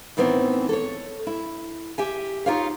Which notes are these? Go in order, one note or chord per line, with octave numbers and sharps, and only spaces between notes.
A2 D#3 E3 B3 C4
A4 C#5
E4
G4 E5 G#5
D#4 F4 G4 C#5 F5